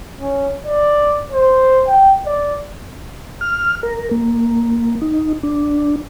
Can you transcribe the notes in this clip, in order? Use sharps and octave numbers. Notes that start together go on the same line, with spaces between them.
C#4
D5
C5
G5
D5
F6
A#4
A#3
D#4
D4